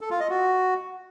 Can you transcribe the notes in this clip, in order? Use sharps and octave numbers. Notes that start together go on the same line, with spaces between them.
A4
F4
D#5
F#4